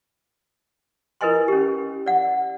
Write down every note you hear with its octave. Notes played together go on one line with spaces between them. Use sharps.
E4 A#4 B4 D#5 G#5 C6
C#4 G4
D5 F#5